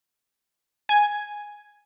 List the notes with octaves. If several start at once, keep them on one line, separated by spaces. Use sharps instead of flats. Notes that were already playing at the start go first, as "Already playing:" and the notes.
G#5